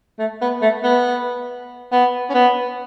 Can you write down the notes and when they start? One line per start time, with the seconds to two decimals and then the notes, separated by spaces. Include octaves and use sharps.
0.19 A3
0.42 B3
0.62 A3
0.84 B3
1.92 B3
2.30 C#4
2.34 B3